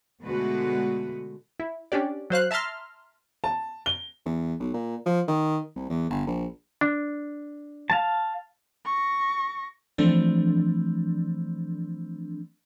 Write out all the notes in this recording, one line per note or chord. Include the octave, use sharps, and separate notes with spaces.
B2 D3 G#3 A3 F#4 B4
E4
C#4 D4 G4 D5
F#3 C5 F5 F#6
E5 A5 A#5 C6 F6
A5
G7
E2
B1
A#2
F3
D#3
C2
E2
G1
A#1
D4
F5 A5
C#6 A#6
E3 F3 A3 C4 D4